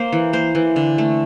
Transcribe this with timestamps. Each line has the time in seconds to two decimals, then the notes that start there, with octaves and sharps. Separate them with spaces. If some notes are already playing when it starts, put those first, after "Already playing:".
Already playing: A#3 C5
0.13 E3
0.33 A#3 C5
0.55 E3
0.76 D3
0.98 A3